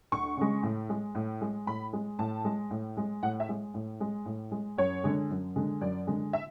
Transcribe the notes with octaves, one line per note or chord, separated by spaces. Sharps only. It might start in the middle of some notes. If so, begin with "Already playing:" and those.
D2 C#6
C#3 G#3
A2
G#3
A2
G#3
A2 B5
G#3
A2 A5
G#3
A2
G#3
A2 F#5
E5
G#3
A2
G#3
A2
G#3
F#2 C#5
D3 G#3
F#2
D3 G#3
F#2 D5
D3 G#3
E5